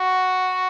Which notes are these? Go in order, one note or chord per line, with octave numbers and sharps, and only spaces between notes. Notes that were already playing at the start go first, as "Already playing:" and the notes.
Already playing: F#4